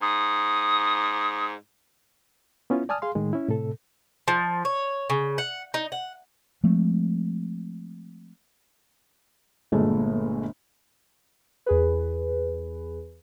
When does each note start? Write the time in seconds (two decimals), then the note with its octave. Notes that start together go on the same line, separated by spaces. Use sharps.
0.02 G#2 D#6
2.70 B3 C#4 E4 F4
2.89 D5 G#5 A5 D#6 F6
3.02 G#4 F5 C6
3.15 A2 D#3 G#3
3.33 C#4 E4
3.48 A2 C3 A4
4.28 F3
4.65 C#5
5.10 C#3
5.38 F#5
5.74 D#4
5.92 F#5
6.64 F3 G#3 A3 C4
9.72 G1 A#2 G#3 A3
11.66 E2 G#4 B4